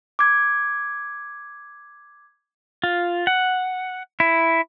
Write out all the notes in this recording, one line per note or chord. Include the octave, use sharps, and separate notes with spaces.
D6 G#6
F4
F#5
E4